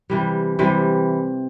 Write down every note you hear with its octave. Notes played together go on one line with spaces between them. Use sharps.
C3 E3 G3
C3 E3 G3